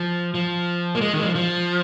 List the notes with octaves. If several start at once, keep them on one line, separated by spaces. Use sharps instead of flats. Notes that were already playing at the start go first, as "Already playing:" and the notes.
Already playing: F3
F3
A#3
G#3
D#3
G#3
F3
F3